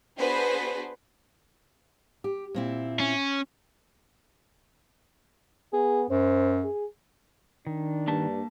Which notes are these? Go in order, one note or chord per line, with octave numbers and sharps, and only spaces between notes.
B3 D4 F#4 G#4 B4 C5
G4
A#2 C4 E4
C#4
B3 G#4
F#2 C5
G#4
D#3 D4
G2 A#3 A5